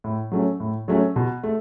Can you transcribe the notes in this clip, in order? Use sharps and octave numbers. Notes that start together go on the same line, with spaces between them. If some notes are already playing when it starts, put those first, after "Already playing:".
A2
F#3 A3 C#4
A2
F#3 A3 C#4
B2
A3